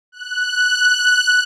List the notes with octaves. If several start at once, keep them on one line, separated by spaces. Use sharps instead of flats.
F#6